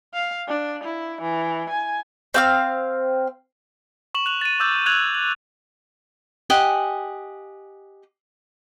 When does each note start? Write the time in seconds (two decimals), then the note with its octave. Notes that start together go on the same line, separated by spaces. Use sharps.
0.14 F5
0.48 D4
0.84 E4
1.21 E3
1.70 G#5
2.34 C4 F5 F6
4.15 C#6 E7 F#7
4.26 F#6 F7 F#7
4.41 A6 D#7
4.60 D6 E6 G6 A6
4.86 F#6 G#6 F7 F#7
5.15 F#7
6.50 G4 D#5 F#5 G#5